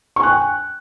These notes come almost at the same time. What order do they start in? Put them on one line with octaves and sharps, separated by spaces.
C#6 G#5 F#6 G5